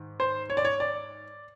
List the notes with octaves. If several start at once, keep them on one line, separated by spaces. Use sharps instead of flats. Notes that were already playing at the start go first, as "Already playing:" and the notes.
Already playing: G#2 D#3
C5
C#5
D5
C#5
D5